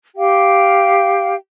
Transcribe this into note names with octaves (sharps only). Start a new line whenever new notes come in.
G4 F5 G5